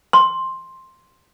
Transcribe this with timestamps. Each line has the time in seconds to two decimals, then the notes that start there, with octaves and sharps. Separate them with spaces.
0.13 C6